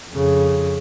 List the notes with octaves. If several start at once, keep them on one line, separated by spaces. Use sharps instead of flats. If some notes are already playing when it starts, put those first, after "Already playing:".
F2 C#3